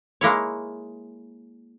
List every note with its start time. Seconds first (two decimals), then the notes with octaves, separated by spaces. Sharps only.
0.21 G#3 A#3 E4 C#5